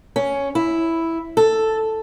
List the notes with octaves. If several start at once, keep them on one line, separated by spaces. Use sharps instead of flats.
C#4
E4
A4